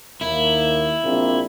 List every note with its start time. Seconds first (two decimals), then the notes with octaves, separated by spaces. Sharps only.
0.21 D#2 A#3 E4
1.03 A#1 A#3 C4